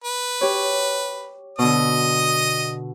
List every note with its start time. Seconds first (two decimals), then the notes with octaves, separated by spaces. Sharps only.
0.04 B4
0.41 G4 C#5
1.59 B2 D3 D#5 D#6